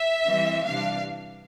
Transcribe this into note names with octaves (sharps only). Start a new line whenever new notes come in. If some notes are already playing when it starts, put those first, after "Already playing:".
Already playing: E5
E3 G3 C4
C3 E3 G3 D4 F5